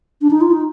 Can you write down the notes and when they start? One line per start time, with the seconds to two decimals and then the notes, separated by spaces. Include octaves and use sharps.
0.21 D4
0.31 D#4
0.41 F4
0.51 D#4